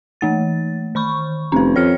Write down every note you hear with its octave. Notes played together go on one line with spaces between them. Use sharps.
E3 A3 A6
D#3 B5 C#6
F1 C#4 B4
F2 C#5 F6 C#7